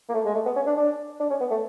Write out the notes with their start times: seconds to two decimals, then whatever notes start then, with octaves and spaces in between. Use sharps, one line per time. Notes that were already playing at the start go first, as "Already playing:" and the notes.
0.09 A#3
0.14 A3
0.26 G#3
0.34 A3
0.45 B3
0.56 C#4
0.66 D4
0.77 D4
1.19 D4
1.30 C#4
1.40 B3
1.51 A3